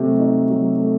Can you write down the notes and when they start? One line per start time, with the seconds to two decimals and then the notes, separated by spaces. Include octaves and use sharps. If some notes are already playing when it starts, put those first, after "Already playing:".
Already playing: C3 F#3 A3
0.19 D#4
0.50 F#3
0.80 A3